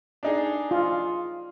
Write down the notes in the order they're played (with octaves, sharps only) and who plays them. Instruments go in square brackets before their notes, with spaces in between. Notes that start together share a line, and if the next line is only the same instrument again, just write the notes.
[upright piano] D4 D#4 G#4
[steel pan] F4